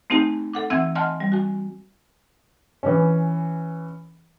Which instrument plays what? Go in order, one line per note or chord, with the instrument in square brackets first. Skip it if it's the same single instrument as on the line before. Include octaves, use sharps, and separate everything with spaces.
[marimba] A3 C4 D#4 G4 G#5
A4 F#5 D6
E3 C4 E5 F#5 E6 G#6
D#5 F#5 G#5 A5 C6 F6
G3
F#4 G#5
[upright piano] E3 C#4